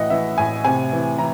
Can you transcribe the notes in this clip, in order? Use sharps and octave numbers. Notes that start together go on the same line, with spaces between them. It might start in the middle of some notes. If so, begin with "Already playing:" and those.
Already playing: A2 E3 D#5 F#5
E3 E5
A2 G#5
C3 G#5
E3
E3 A#5